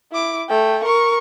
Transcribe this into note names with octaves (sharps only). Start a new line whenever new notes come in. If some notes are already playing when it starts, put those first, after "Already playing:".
E4 D6
A3 G5
A#4 C#6